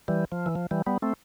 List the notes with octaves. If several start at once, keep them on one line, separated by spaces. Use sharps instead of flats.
E3 G3
F3
E3
F3
E3 G3
G3 B3
A3 C4